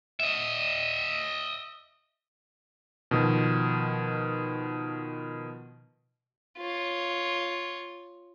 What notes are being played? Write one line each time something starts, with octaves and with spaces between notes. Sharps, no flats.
D#5 E5
B2 D#3 F3
F4 C#5